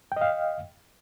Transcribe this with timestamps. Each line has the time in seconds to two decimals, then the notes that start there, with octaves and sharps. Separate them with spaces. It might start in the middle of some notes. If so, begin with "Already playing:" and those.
0.12 G5
0.16 D#5
0.21 F5